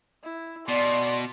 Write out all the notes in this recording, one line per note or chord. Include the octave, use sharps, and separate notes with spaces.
E4
B2 D5 C6